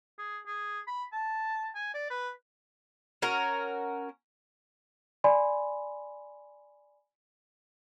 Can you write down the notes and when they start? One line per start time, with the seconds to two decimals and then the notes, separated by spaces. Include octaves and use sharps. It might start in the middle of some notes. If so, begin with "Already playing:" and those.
0.18 G#4
0.46 G#4
0.87 B5
1.13 A5
1.75 G#5
1.94 D5
2.10 B4
3.22 C#4 F#4 A#4
5.24 D5 G#5 B5 C6